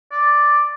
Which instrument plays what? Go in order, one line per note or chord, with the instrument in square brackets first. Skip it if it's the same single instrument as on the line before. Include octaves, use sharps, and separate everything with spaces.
[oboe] D5